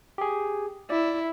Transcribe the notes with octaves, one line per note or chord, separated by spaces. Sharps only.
G4 G#4
E4 D5